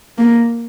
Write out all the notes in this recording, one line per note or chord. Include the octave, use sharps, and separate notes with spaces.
A#3